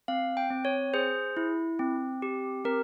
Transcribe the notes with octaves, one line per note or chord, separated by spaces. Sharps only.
C4 F5
G5
C4
C#5
G#4 C5
E4
C4
G4
C4 A#4